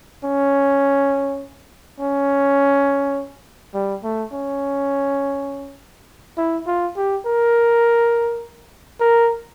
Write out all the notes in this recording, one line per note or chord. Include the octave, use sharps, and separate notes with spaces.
C#4
C#4
G3
A3
C#4
E4
F4
G4
A#4
A#4